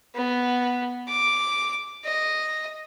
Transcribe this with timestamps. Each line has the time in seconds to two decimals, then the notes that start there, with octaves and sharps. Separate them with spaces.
0.15 B3
1.08 D6
2.05 D#5